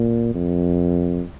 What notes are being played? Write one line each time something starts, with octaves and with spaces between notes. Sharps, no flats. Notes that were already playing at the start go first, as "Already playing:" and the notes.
Already playing: A#2
F2